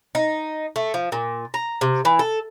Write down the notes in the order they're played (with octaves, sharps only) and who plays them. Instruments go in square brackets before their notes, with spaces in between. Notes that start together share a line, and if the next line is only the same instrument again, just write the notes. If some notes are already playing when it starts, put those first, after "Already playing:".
[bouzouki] D#4
A3
F3
A#2
A#5
C3
E3
A4